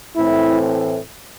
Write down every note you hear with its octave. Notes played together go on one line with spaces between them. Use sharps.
A2 E3 A3 C4 E4